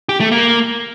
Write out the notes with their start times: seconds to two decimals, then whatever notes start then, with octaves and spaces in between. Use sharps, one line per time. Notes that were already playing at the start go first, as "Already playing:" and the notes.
0.09 G4
0.20 A3
0.32 A#3